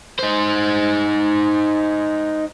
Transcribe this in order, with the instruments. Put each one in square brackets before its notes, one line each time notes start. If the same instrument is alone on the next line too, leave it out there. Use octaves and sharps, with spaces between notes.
[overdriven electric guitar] D#4 C5